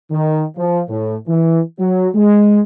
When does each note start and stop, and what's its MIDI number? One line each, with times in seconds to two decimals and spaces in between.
0.11 0.44 51
0.57 0.81 53
0.89 1.16 45
1.28 1.60 52
1.79 2.08 54
2.15 2.61 56